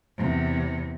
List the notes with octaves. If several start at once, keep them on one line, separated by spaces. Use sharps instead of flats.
E2 C3